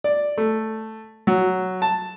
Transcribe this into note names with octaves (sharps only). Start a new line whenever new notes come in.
D5
A3
F#3
A5